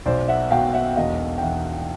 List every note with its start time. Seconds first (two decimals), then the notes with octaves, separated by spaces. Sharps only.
0.06 B1 C5 D5
0.28 E5 F#5
0.51 B2 F5 G5
0.74 E5 F#5
0.96 E1 D#5 F5
1.38 G5
1.42 E2 E5 F#5